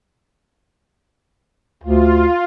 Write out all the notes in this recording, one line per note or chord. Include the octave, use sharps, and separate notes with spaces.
D2 F4